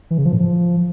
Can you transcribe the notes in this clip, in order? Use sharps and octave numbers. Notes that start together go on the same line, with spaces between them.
E3
C#3
F3
A2
F3